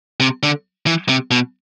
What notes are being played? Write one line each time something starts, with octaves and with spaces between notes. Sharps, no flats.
C3
D3
E3
C3
B2